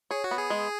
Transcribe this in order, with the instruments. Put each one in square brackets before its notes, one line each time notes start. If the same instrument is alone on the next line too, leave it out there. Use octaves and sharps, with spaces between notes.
[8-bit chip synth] G#4 [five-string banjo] C#5
[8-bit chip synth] F#4
[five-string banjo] B3
[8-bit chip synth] G#4
[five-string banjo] G#3